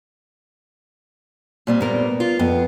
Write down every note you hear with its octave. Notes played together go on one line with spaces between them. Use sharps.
A#2 G3 C4
B3 A#4
F4
F2 B3